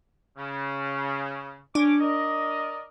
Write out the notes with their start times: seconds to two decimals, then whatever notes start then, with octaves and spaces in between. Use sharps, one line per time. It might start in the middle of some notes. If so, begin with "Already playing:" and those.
0.37 C#3
1.75 C#4 D4 D6
2.01 A#4 D5 D#5